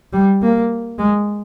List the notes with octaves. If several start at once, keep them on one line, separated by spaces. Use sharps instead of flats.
G3
A#3
G#3